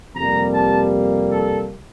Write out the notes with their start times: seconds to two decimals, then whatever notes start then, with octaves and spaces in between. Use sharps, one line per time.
0.15 F2 C3 G3 A#3 A#5
0.54 A5
1.31 A4